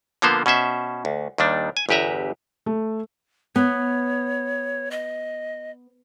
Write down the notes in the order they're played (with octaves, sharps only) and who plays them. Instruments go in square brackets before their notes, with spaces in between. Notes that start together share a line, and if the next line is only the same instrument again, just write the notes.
[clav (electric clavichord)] D3 F3 A#3 B3 C5
B2 C#4 C5 E5
D2
D#2 D#3 G3 D4
G#5
G1 E2 G4 B4 E5 A#5
[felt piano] A3
[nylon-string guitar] B3 [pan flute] C#5
[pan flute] D#5